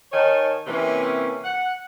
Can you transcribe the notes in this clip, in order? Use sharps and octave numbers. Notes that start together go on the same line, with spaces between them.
D#3 D#4 C#5 G#5 A5
C3 E3 A#3 C4 C#4
F#5